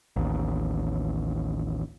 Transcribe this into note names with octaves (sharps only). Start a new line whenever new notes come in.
A1 D#2